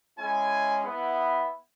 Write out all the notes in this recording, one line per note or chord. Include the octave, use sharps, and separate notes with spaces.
G#3 C#4 E4 G#5
B3 E4